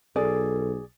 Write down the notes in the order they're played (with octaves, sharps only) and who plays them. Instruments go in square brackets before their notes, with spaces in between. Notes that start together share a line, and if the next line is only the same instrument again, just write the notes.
[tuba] B1 [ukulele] G#4 D5 [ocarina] A4